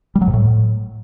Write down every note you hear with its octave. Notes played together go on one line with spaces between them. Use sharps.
G3
F#3
G#2
A2